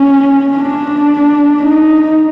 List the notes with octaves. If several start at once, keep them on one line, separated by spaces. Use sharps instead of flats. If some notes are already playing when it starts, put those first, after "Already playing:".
Already playing: C#4
D4
D#4